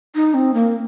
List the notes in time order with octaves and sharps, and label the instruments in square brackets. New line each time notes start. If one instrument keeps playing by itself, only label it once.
[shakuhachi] D#4
C4
A#3